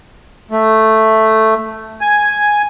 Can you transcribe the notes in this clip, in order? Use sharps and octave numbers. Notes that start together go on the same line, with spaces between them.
A3
G#5